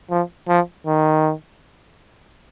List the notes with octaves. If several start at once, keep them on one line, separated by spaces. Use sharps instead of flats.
F3
F3
D#3